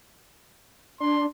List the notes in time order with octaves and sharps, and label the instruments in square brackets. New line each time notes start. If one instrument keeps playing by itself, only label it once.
[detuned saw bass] D4 [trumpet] C6